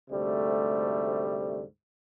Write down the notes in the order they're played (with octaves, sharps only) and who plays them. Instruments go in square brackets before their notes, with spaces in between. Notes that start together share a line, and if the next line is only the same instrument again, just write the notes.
[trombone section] D2 G#2 C3 G3 A3